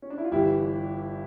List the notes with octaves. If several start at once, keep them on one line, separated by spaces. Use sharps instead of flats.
C#4
D4
E4
F4
G1 G2 E3 G3 E4 G4